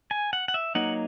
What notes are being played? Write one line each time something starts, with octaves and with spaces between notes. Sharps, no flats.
G#5
F#5
F#5
E5
F#3 A#3 D#4 F#5